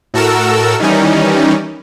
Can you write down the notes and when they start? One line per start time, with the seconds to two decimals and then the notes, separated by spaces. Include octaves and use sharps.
0.14 A2 F#4 A4 A#4 E6
0.79 D#3 E3 G3 C#4 D#4